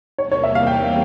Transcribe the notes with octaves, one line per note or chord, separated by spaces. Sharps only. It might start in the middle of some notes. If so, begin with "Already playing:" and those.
E2 C3 G3 A#3 C#5
C#5
E5
F5
G5